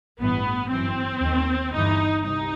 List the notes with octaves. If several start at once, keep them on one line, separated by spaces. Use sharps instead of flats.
A1 G2 E3 B3
G1 F#2 E3 C4
D#2 D#3
G1 G2 E3 D#4
C2 C3 D#4